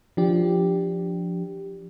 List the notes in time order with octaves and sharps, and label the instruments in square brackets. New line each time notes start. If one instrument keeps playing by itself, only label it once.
[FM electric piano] F3 D4 G4